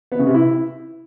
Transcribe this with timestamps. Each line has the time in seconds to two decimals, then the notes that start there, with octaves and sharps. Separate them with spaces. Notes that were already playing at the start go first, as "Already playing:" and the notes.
0.12 B3
0.19 C#3
0.27 C3
0.34 E4